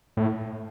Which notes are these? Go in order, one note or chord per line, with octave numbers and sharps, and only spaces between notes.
A2